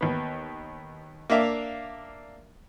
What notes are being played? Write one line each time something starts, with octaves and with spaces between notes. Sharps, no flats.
D#2 B3
A#3 D4 E5 F5